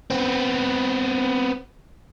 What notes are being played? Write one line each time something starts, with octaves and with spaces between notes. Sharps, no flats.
B3 C4